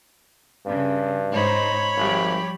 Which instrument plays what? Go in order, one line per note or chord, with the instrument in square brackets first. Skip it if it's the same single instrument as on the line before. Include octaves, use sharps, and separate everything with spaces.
[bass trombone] G2 [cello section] C#3
[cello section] G#2 D#4 C5 [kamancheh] C#5 B5
[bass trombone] G#1 [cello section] F3 G3 G4